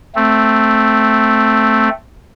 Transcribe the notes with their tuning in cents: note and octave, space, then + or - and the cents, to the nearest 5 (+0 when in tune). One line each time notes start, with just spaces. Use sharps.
A3 +0 C4 +0